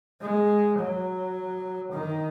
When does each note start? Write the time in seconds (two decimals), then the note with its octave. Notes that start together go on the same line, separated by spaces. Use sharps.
0.21 G#3
0.78 F#3
1.92 D#3